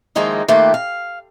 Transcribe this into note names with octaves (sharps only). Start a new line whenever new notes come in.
D#3 F3 G#3 A#3 D#4 E4
D#3 A3 A#3 F4 G4 B4
F5